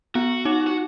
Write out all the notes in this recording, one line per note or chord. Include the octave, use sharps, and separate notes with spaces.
B3 F#4
D#4
F#4